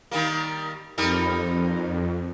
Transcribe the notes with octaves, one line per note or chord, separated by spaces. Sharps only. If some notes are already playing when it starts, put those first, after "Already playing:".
D#3 G3 A#3
F2 G3 D#4 A#4